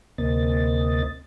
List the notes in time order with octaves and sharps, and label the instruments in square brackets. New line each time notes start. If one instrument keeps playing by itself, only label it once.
[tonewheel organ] D2 C3 A#3 C4 D#5 A6